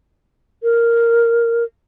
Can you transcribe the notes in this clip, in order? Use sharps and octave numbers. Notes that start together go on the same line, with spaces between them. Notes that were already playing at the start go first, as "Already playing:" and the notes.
A#4